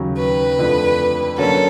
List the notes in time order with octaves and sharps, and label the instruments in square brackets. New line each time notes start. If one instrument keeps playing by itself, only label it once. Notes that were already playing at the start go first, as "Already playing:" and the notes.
Already playing: [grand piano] D#2 C#3 F#3
[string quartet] B4
[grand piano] F2 D3 F3 A3
[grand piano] D3 F#3 A#3 C#4 F#4 [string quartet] A4